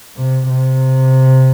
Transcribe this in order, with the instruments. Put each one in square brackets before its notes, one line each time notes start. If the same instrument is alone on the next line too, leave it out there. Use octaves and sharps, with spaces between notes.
[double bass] C3
C3